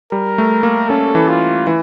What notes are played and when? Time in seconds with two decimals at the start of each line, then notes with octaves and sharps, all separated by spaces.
0.12 G3 A#4
0.38 A3
0.63 A#3
0.89 C#4 A4
1.15 E3
1.28 F4
1.67 E3